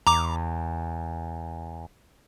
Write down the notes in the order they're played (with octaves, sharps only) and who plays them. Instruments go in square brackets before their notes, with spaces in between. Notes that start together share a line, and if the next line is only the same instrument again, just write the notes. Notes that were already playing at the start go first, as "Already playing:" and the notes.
[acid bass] E2 [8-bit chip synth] A#5 D6